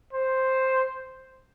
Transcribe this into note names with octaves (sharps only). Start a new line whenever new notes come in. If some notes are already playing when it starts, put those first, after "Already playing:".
C5